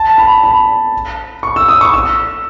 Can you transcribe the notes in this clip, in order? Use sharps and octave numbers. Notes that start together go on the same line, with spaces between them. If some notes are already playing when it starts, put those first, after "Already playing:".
Already playing: A5
B5
B5
C#6
E6
D#6
C#6
E6